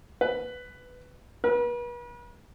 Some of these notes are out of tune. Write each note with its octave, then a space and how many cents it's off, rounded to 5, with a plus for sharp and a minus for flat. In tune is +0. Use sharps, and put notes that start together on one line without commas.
B4 +10
B4 -40